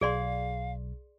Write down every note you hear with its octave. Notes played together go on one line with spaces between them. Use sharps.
B1 G#4 D5 F5 C6